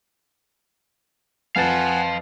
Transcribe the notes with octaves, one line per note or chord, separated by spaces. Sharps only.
F2 B4 F5 F#5 G#5 A5 A6